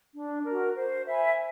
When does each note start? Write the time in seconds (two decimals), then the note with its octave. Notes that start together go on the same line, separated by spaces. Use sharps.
0.14 D4
0.45 F#4 A#4
0.76 C5
1.07 E5 G#5 B5